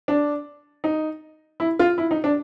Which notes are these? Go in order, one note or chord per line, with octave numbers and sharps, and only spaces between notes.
D4
D#4
E4
F4
E4
D#4
D4